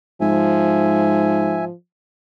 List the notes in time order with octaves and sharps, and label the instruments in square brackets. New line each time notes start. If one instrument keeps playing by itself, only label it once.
[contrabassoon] G#2 [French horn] F3 [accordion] E5 G#5